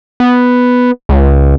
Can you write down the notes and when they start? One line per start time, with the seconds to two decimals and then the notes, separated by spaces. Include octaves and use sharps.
0.20 B3
1.09 C#2